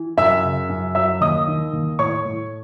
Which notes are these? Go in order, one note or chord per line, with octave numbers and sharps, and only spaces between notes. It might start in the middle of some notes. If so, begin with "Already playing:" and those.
Already playing: E3
F#2 E5 E6
C#3
F#2
F#3 E5 E6
D#2 D#5 D#6
D#3
D#2
A2 C#5 C#6
A2